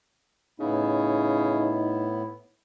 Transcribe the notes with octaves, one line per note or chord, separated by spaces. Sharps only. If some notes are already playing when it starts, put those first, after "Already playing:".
A2 C#3 B3 D#4 E4